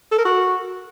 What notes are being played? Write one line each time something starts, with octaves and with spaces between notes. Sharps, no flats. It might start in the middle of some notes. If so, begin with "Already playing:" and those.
A4
A#4
F#4